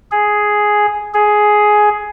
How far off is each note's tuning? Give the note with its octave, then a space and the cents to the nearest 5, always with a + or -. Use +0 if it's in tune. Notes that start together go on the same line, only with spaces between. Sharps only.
G#4 +5
G#4 +10